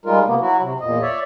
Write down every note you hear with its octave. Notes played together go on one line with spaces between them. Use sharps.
G3 G#3 D#4 F4 A#4
C3 A#3 B3
F#3 E4 F#4
C3
E2 A#2 D#5
C#5 D5 E5